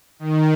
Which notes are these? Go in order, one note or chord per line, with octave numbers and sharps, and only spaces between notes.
D#3